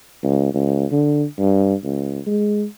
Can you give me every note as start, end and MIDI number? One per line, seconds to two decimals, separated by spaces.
0.23 0.53 37
0.54 0.85 37
0.92 1.25 50
1.39 1.75 43
1.84 2.20 37
2.27 2.66 56